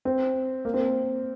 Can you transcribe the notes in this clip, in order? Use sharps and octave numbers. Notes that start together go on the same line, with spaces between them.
C4
A#3
C4